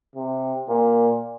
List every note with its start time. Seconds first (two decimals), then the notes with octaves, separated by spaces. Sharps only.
0.15 C3
0.69 A#2